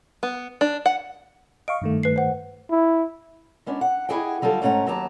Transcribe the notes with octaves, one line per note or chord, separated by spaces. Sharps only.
B3
D4
F#5
D#5 F5 C#6 D7
G2 D#3 A3
B4 C7
C5 F#5
E4
G#3 B3 C#4 D4
F#5
E4 G4 G#4 D#5 F#5 G5
D3 F#3 G3 F4 A4
G#2 A3 C#4 C#5 F#5 A#5
D#2 F#3 B3 G4 A5 A#5